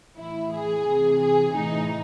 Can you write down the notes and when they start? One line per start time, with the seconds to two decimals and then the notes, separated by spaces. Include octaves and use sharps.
0.17 A2 E3 E4
0.52 G#4
0.86 C3 E3
1.21 G#4
1.56 A2 E3 D#4